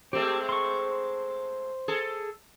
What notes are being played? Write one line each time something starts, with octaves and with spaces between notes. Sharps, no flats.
G#3 A3 C4 G4 C5
C6 C#6
G#4 A4